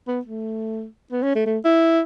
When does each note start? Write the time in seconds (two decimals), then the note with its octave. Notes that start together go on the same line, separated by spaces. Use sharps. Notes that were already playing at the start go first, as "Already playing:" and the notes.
0.08 B3
0.25 A3
1.12 B3
1.23 C#4
1.36 A3
1.46 A3
1.65 E4